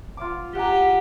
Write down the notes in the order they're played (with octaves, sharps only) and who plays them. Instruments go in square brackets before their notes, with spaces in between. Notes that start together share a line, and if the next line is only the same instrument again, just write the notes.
[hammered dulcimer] F4 F5 D6
[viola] G4 [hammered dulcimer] F#5 G#5 A#5